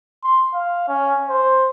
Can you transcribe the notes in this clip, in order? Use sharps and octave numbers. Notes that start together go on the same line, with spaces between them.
C6
F5
C#4
C5